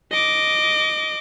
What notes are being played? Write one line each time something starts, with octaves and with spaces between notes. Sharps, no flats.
D#5 D6